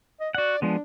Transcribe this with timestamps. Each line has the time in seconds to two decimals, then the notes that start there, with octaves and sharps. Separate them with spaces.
0.20 D#5
0.35 F#4 D5 F#5
0.62 F3 G#3 B3 D4